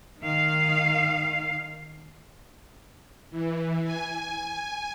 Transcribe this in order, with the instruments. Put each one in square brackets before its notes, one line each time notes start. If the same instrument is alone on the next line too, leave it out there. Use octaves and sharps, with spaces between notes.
[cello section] D#3 F5
[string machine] E3
G#5